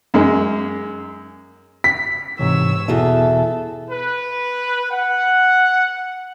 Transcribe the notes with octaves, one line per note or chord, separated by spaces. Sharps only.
F#2 G#3
B6
G#2 C3 E3 C#5 E6
E2 B2 F#4 G#4 A4 E5
B4
F#5